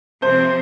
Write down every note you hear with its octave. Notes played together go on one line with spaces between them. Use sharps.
C3 F3 C4 C5